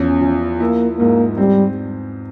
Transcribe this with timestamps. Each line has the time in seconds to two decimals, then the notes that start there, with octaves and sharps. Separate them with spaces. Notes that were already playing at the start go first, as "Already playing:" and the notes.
Already playing: E2 F3 C#4 E4
0.21 F3
0.60 A#3 E4
0.99 G#2 A#3
1.37 G3 C4